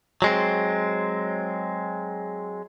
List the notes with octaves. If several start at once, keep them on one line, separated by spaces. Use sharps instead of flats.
F#3 G#3 C4